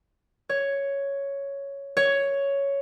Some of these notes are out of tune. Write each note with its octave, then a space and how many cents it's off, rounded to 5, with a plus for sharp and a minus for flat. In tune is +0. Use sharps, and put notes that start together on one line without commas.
C#5 +5
C#5 +5